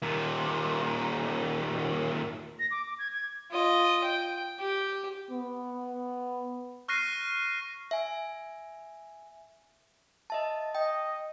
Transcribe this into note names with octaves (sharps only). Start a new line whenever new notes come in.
D#2 A#2
A#6
D6
D6
G#6
G#6
F4 D#5
G5
G4
B3
C#6 F6 F#6 A#6 C7 D#7
E5 G#5
D#5 E5 A5
D#5 G5